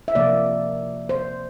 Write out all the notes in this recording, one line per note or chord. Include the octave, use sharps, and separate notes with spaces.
E5
C3 F3 A#3 D5
C5